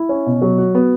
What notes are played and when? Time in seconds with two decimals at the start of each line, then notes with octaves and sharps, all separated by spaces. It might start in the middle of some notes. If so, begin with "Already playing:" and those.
Already playing: E4
0.09 C#4
0.26 B2
0.42 F#3
0.58 F#4
0.75 B3